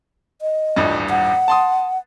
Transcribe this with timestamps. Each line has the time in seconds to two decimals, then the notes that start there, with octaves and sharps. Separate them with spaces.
0.42 D#5
0.76 D#1 A1 G2
1.10 F#5
1.48 A5 C6 D#6